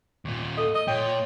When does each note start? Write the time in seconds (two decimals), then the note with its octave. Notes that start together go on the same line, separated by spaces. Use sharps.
0.25 D#2 A#2
0.57 A4 D#5
0.75 D#5
0.88 A#2 C#5 G5